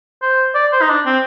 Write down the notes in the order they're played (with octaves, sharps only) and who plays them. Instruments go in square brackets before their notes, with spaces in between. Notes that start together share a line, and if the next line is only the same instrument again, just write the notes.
[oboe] C5
D5
C5
D#4
D4
C4